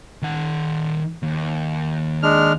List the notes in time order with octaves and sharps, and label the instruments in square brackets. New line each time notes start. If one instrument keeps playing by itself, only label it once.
[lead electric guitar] D#3 F#5
D#2
[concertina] G#3 D4 F6